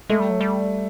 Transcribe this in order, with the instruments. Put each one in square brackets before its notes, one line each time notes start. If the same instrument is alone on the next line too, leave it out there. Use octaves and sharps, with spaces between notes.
[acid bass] G#3 [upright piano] A3
[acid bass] G3
F#3
G3